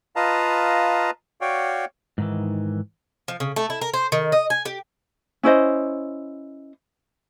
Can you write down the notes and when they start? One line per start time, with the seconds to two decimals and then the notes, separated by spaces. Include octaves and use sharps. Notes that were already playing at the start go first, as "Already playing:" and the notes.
0.16 F4 B4 D#5 F5 A5 A#5
1.41 F#4 C#5 D5 F5 G5
2.18 G#2 D#3 E3
3.28 F3
3.40 C#3
3.56 A3
3.70 E4
3.82 A#4
3.94 C5
4.12 D#3
4.32 D#5
4.50 G#5
4.65 G4
5.43 C#4 E4 C5 D#5